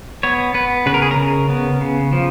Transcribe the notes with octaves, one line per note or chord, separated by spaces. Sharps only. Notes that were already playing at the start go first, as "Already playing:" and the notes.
B3 C#5
B3 B4
C#3 B4
A#4
G#4
A#4
C#3
B3
C#3
F3